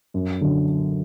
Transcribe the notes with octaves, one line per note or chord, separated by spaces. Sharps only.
F#2
D3 F#3